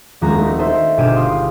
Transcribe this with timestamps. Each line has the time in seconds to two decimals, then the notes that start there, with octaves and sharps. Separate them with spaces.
0.21 D#1 F3 G#3 F#4 A#5
0.38 A3 D#4
0.59 D#4 A4 C5 D#5 E5
0.97 G1 B2 G4 G#4 D#7 E7
1.16 F5 C6 D#6